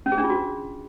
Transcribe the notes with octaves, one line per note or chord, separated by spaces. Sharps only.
C#4
G#4
D4
F4
F#4